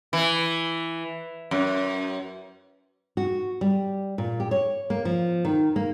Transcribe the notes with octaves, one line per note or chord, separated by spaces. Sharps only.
E3
F#2
F#4
G3
A#2
G4
C#5
A#3
F3
D#3
A#3